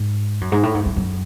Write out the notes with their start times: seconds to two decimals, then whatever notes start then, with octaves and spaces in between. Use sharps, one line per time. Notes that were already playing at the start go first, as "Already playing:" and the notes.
Already playing: G#2
0.41 F#2
0.52 G#2
0.63 A2
0.75 G#2
0.86 F#2
0.97 F#2